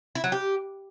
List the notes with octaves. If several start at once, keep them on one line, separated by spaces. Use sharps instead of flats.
E4
F#3
G4